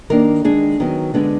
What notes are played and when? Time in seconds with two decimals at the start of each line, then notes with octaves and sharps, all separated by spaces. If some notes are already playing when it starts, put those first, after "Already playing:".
0.10 D#3 A#3 D4 A#4
0.44 D#3 G#3 D4 G#4
0.80 D#3 F#3 B3
1.14 D3 G#3 B3 D4